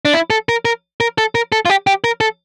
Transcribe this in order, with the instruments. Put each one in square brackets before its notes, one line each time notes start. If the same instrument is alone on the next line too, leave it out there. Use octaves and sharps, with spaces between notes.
[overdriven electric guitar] D4
E4
A4
A#4
A#4
A#4
A4
A#4
A4
F4
G4
G4
A#4
A4